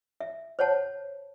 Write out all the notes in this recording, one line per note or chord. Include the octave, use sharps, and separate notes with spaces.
E5
C5 C#5 F#5 A5